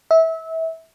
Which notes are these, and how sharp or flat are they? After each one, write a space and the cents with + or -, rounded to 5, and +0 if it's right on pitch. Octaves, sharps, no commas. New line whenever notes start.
E5 -25